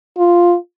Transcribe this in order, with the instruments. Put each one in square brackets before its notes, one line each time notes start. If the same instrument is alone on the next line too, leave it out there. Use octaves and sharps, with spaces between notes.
[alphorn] F4